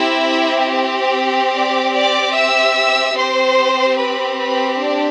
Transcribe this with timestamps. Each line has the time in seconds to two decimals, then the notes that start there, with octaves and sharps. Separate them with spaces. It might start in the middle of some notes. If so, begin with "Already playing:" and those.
Already playing: C4 E4 G4 E5
1.54 D5 D6
1.95 D5 D6
2.35 E5 E6
3.16 C4 G4 C5 C6
3.98 B4 B5
4.39 B4 B5
4.80 D4 D5